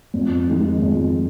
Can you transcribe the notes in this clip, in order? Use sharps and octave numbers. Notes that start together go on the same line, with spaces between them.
F2
D#3 G#3 D#4
F2